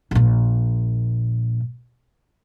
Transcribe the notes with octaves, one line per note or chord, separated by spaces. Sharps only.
A#1 A#2